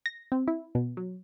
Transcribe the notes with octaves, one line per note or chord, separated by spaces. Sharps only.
A#6
C4
E4
B2
F#3